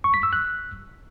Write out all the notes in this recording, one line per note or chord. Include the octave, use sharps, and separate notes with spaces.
C#6
B6
E6
F#6